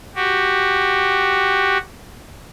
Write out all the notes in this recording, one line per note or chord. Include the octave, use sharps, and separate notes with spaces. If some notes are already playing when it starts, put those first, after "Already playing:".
F#4 G4